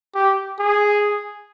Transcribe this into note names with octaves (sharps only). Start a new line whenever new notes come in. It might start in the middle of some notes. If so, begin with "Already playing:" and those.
G4
G#4